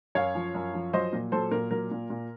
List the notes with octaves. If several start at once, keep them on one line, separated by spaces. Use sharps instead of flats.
F#2 C#5 F5
F3
F#2
F3
F#3 C5 D#5
A#2
F#3 A4 C5
A#2 A#4
F#3 A#4
A#2
A#2